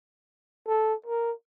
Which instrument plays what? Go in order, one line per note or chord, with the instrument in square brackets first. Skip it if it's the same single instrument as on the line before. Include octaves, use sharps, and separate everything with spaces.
[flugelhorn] A4
A#4